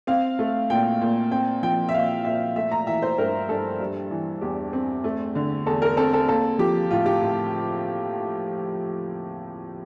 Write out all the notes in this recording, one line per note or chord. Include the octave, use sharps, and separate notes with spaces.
C4 F5
A3
A#2 G5
A#2
C4 G5
F3 G5
E5
A#2 F5
A#2 E5
A3 E5
A#5
E3 E5
C5
G2 A#4
G2 A4
G3
E3
E2 G4
C4
A3
D3
E2 A4
A#4
C4 A4
A4
A#3 A4
F3 G4
A2 F4
G4
A2